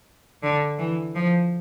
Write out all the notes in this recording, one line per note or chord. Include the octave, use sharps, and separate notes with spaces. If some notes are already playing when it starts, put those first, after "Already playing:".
D3
E3
F3